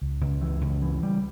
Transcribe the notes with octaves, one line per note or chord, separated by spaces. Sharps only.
C#2
C#2
E3
C#2
E3
G3